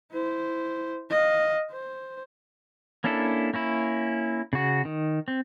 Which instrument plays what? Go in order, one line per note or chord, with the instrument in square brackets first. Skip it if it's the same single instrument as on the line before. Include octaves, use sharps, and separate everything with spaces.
[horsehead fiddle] E4 C5
D#5 F5
C5
[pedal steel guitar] A#3 C#4 D4 E4 A4
A#3 C#4 E4
C#3 F#4
D#3
C4